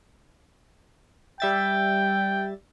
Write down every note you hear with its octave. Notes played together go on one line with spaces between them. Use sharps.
G3 E5 G5 A6